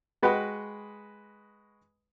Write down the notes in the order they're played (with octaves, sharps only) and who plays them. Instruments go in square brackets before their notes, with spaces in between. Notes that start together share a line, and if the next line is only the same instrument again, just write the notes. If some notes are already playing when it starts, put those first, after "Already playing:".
[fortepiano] G#3 F#4 B4 D#5 F#5 G5